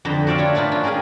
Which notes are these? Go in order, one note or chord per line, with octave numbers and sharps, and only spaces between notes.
F2 D3 B4 C5 D#5 A#5
F#4 C5 D5 E5 F5 G5
D4 E4 F4 C#5
A#3 D4 D#4 F4 B4
C#4 F4
G#3 D#4 G4 G#4 A#4